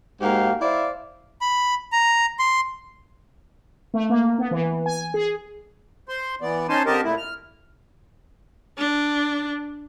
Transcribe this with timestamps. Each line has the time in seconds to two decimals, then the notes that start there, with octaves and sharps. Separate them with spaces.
0.21 G#2 A#3 F#4 G4 F5
0.61 E4 C5 D5 E5 F5
1.41 B5
1.92 A#5
2.39 C6
3.94 A3
4.10 A#3
4.38 B3
4.51 E3
4.86 G#5
5.14 G#4
6.09 C5 C6
6.42 E3 B3 D5
6.69 C#4 D#4 C5 G#5 A5 C6
6.86 D3 C4 G4 A#4 D#5 A5
7.04 A#2 A3 E4
7.17 F6
8.78 D4